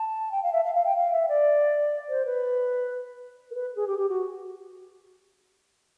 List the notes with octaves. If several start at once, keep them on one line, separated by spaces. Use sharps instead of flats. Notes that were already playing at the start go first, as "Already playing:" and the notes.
Already playing: A5
G5
F5
E5
F5
F5
G5
F5
E5
D5
C5
B4
A#4
B4
G#4
G4
G4
F#4